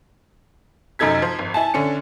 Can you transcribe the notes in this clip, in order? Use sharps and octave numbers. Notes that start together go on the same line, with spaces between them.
F1 F#2 D#4 A4 G#6 B6
F3
G#1
E4 G#5 A5
D3 C#4 D4 C#7